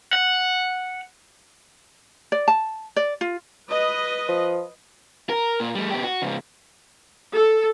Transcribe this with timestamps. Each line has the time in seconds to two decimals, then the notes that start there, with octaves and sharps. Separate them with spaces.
0.13 F#5
2.32 D5
2.48 A5
2.96 D5
3.21 F4
3.69 B4 D#5
4.29 F3
5.29 A#4
5.60 A#2
5.75 G3 A3
5.91 B2 G4
6.04 F#4
6.22 G#2 C#3
7.35 A4